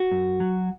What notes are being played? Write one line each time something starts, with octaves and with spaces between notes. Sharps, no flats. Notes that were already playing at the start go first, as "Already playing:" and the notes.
Already playing: F#4
F#2
F#3